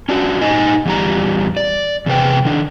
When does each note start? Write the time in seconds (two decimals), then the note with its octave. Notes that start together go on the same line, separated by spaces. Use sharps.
0.09 C#4 D4 F#4
0.41 A#2 D#4 D#5 G#5
0.86 E2 G3 A#5
1.57 D5
2.06 E2 C3 G#4 B4 G5
2.45 D#3 D4